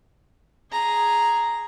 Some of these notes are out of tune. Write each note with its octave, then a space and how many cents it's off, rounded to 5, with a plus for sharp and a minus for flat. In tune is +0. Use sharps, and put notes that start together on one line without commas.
G#4 +0 A#5 +0